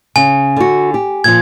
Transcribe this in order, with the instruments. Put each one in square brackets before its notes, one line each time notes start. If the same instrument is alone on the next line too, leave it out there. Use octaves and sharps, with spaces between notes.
[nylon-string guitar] C#3 [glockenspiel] G#5
[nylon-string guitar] D3 F#4
G4
[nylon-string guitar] A#2 F3 [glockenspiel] G#6